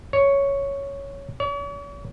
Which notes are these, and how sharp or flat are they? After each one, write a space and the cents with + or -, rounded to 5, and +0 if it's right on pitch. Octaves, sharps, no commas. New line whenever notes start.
C#5 +5
C#5 +45